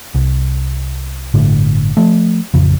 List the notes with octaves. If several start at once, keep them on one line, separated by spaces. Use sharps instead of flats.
C2
G1 A2 D3
F3 A3
A1 F2 C#3